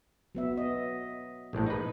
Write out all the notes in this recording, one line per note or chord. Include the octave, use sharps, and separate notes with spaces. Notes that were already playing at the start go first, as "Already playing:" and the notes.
F#3 B3 E5
D#5
A#1 A2
D#4 B4